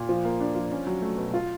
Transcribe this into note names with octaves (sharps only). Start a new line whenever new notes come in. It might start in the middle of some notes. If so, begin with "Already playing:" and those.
Already playing: A#2
F3
A#3
D4
F3
C#4
F#3
A3
B2
F4